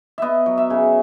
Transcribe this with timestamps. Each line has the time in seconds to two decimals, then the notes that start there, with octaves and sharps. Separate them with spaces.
0.18 B3 D#5 E5
0.46 F#3
0.58 E5
0.70 C#3